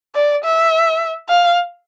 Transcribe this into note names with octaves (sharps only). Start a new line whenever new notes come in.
D5
E5
F5